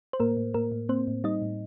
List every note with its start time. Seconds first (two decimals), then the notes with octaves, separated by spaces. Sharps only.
0.13 C5
0.20 A2 A#3 A#4
0.37 A2
0.54 A2 A#3 A#4
0.72 A2
0.89 A#3 C4 C5
1.07 A2
1.24 G3 D#4 D#5
1.42 A2